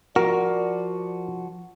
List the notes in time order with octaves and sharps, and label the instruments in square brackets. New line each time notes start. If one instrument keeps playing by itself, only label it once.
[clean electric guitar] F3 F#4 [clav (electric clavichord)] A#4 [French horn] D5